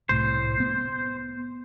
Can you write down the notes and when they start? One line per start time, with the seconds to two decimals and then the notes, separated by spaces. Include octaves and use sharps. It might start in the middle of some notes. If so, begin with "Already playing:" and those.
0.09 C2 A2 C5
0.60 B3